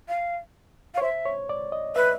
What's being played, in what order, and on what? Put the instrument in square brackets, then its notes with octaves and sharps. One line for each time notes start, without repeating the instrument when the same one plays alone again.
[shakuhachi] F5
F5
[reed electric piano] C#5
[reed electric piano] C5 [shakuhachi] E5
[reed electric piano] C#5
D5
D#5
[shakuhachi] B4 [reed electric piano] E5